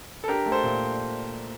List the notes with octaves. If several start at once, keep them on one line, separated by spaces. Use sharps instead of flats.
A4
D4 G4 A#4
A3
A4 C5
A#2